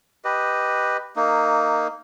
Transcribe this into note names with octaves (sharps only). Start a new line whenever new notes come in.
G4 B4 D#5
A#3 D#4